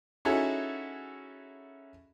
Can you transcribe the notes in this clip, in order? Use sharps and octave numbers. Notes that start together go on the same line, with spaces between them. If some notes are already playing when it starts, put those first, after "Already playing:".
C#4 D#4 E4 F#4 G#4 A4